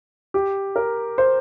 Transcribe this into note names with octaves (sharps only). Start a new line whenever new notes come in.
G4
A#4
C5